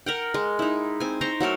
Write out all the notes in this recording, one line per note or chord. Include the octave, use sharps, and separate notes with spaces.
A#4 F#5 G5
G#3
D#4 E4
C4 G#5
C5 G5 A#5 C#6
F#3 A3 A4 A#4